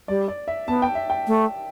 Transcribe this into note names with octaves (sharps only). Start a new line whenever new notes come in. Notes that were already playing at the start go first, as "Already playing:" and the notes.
G3 D5
D5
E5
B3 A5
G5
E5
G5
A3